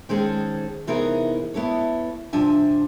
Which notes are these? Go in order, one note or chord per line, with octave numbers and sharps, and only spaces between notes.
D#3 G#3 C4 C#4 G#4 A4
C3 E3 B3 D#4 G#4 A#4
B3 E4 A4 C#5
G2 C3 F3 D4 E5 G#5